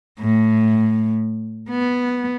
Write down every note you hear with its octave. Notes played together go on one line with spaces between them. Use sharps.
A2
B3